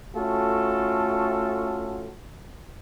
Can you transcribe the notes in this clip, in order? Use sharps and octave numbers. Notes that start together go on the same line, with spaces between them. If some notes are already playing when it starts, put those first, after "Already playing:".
A3 C#4 F4 F#4 A4